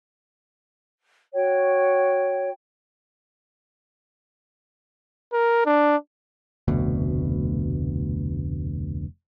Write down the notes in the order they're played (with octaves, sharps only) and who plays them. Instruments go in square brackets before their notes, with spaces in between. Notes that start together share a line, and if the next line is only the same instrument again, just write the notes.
[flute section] F#4 C#5 G5
[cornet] A#4
D4
[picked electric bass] F1 D2 B2